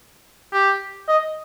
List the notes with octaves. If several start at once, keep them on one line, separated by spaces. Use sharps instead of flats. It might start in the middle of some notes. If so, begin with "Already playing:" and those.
G4
D#5